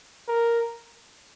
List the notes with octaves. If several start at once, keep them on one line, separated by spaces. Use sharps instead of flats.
A#4